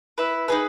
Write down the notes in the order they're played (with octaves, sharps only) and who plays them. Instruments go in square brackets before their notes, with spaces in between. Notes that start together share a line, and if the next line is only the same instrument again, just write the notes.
[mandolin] E4 B4 E5
D#4 G#4 B4